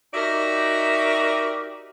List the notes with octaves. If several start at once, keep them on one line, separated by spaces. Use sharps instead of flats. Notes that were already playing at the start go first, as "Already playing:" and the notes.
D#4 F#4 G4 A#4 D5 E5